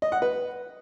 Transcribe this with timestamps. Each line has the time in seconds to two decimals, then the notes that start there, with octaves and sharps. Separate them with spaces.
0.02 D#5
0.12 F#5
0.22 B4